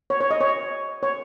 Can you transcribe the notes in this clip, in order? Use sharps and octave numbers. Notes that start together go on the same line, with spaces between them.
C#5
C#5
D#5
C#5
C#5